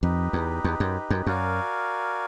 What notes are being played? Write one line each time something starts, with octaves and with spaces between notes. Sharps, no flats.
F2 D#4 G4 B4 D#5
E2
E2
F#2
F#2
F#2 F#4 A#4 D5 F5 G#5